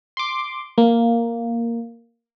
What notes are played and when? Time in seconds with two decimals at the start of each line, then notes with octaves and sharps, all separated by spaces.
0.17 C6 D6
0.78 A#3